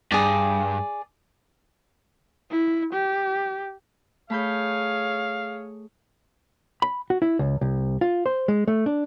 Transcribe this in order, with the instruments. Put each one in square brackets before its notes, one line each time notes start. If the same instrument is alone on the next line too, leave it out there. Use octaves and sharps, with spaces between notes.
[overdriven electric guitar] G2 [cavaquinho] G#4 D5
[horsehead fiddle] E4
G4
[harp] A3 B5 G6 [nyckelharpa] G#4 C#5 [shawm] F5
[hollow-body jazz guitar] B5
F#4
E4
C#2
C2
F4
C5
G#3
A3
D4